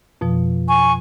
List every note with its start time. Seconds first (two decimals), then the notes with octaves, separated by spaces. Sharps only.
0.21 F2 B2 F3
0.67 G#5 C#6